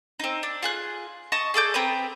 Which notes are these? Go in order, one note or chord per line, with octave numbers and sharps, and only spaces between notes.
C4 D#4
D4
F4 G#4 F#6
D#5 A5 C#6
G#4 A4 D5 G6
C4 B4 A#5 D#6